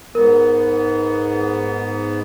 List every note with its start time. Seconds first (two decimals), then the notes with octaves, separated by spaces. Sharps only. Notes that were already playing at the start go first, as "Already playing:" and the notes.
0.15 G#2 B3 A#4